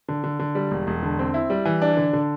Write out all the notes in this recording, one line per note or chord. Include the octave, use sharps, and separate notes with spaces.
D3
D3
D3
G3
E1
E1
D3
C4
E4
G3
E3
D4
D3
D3